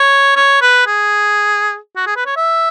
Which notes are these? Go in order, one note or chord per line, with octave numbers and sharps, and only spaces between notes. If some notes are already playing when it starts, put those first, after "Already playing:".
Already playing: C#5
C#5
B4
G#4
F#4
G#4
B4
C#5
E5